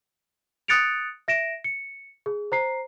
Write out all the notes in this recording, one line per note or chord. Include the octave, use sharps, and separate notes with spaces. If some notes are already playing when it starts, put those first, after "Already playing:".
D#6 F#6 A6 C#7 D7 F7
E5 A#6 D7 E7
C#7
G#4
C5 A#5 C7